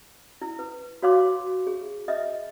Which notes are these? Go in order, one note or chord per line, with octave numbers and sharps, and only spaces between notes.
E4
B4
F#4 C#5 F5 C6 D6
G#4
D#5 E5